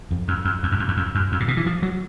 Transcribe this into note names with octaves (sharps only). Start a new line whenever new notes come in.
F2
F2
F2
E2
F#2
F2
E2
F2
F#2
F2
A#2
B2
E3
F3
F#3